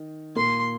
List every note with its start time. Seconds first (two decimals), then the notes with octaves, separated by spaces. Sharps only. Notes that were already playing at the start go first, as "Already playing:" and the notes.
Already playing: D#3 D#4
0.36 A#2 A#3 C6